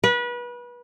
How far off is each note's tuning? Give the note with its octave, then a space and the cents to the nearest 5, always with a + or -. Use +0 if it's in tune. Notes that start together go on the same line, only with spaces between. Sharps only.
B4 -30